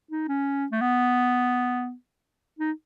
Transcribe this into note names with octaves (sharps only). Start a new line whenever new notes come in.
D#4
C#4
A3
B3
D#4